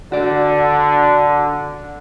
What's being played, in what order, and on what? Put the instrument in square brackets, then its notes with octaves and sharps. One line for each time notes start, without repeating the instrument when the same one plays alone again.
[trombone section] D3 [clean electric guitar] F#4 D5